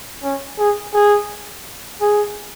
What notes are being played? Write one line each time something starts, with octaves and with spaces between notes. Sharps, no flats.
C#4
G#4
G#4
G#4